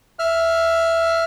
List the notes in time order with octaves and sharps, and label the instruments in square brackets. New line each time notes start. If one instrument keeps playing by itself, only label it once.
[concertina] E5 F6